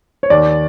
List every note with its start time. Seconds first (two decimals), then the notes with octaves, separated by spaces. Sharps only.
0.23 C#5
0.30 D#2 D5